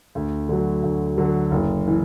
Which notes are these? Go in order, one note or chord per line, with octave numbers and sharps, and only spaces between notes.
D2
D3 F#3
D2
D3 F#3
F#1
E3